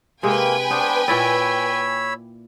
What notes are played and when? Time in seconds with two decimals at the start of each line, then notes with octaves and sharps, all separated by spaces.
0.23 C3 G#3 A#3 B4 G5 G#5
0.71 B3 D4 C5
1.08 A#2 E4 C#5 D5 B5 E6